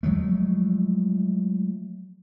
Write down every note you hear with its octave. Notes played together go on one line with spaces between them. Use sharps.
F3 F#3 G#3 A3